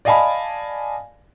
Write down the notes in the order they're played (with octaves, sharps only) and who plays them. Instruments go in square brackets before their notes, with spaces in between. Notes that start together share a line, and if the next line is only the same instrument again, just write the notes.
[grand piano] D5 D#5 F5 G#5 A5 B5